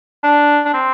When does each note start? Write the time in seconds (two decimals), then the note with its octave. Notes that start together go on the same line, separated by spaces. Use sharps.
0.24 D4
0.66 D4
0.74 C4